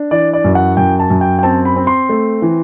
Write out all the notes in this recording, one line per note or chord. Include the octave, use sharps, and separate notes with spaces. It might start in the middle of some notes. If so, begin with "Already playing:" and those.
Already playing: D4
E3 D5
D5
F#2
F#5
F#2 G5
A5
F#2
G5
G5
C4 A5
B5
C4
C6
A3
E3